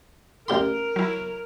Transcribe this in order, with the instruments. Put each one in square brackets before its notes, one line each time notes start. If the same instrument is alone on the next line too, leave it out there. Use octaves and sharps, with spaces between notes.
[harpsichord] A1 G4 C6 [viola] A#4
[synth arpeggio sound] F#3 E4